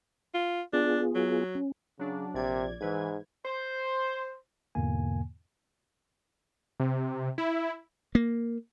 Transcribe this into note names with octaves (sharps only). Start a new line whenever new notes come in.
F4
B3 D4 F4 G#4
F#3
C#4
C#3 F#3 D4
A#1 C3 D5 G#6
G#2 E3 B4 G#6
C5
E2 G#2 B2 D3 A#3 G#5
C3
E4
A#3